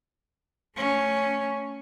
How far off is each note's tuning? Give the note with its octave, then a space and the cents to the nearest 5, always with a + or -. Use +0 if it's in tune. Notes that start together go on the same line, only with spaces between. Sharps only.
A3 +15 C#4 +0